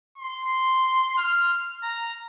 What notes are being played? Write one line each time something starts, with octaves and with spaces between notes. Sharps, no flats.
C6
F6
A#5